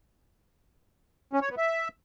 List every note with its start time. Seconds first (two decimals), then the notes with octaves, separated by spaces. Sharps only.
1.33 C#4
1.41 C#5
1.50 B3
1.58 E5